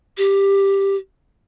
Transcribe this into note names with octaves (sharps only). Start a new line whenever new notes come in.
G4